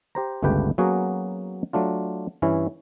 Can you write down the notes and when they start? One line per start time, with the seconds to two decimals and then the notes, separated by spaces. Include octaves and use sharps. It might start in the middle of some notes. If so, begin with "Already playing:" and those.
0.15 G4 C5 A#5
0.43 G1 C#2 A3 G4 B4 G5
0.78 F#3 A#3 B3 C#4 F#4 G#4
1.73 F#3 A3 D4 F4
2.42 G2 E3 C#4 E4